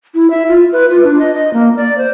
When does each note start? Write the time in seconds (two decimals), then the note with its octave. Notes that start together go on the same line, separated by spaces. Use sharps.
0.15 E4
0.30 E5
0.48 F4
0.72 B4
0.90 F4
1.04 D4
1.19 D#5
1.35 D#5
1.54 A#3
1.77 D5
1.98 C5